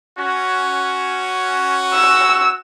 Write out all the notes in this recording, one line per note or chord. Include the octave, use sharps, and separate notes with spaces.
C#4 F#4
E6